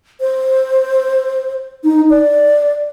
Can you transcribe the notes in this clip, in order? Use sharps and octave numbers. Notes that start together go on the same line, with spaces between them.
C5
D#4
D5